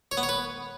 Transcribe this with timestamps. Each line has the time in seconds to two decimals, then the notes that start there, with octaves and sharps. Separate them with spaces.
0.12 C#5
0.17 B3
0.23 C#5
0.29 B4